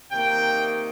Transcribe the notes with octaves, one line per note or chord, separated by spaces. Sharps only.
C3 D#3 A#3 D#4 G5